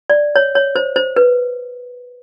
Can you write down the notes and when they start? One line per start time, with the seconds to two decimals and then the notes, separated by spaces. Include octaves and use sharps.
0.10 D5
0.36 C#5
0.55 C#5
0.76 C5
0.96 C5
1.16 B4